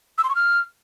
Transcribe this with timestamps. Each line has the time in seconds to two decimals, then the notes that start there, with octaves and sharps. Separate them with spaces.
0.18 E6
0.24 C6
0.29 C#6
0.35 F6